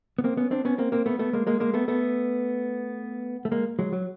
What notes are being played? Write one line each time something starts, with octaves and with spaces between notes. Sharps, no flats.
B3
A#3 C4
B3 C#4
C4 D4
B3 C#4
A#3 C4
A#3 C4
A3 B3
A3 B3
G#3 A#3
G#3 A#3
G#3 A#3
A3 B3
A3 B3
A3
G#3 A#3
F#3 G#3
F#3